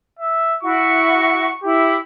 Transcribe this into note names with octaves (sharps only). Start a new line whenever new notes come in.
E5
E4 F#4 C#6
E4 G4